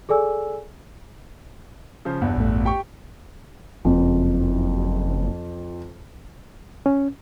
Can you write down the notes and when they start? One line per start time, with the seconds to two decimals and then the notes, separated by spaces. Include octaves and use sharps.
0.09 G#4 A4 D5 G#5 E6
2.05 C#3 F3 C5
2.21 G1 E2 G2
2.36 A1 A3
2.65 G4 G5 C#6
3.85 F#1 F2
6.86 C#4